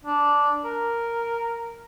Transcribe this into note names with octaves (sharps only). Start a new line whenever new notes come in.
D4
A#4